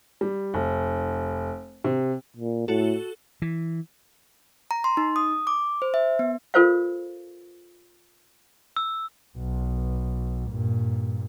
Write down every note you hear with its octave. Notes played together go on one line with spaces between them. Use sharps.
G3
F1
C3
A#2
A2 F#4 A4
E3
A#5
C6
D#4
D#6
D6
C5
E5
B3
F4 A4 A#4 C5 D5 F5
E6
B1
G2 A#2